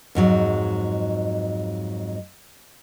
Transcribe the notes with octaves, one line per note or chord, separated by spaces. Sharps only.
F2 G#2 F#3 G#3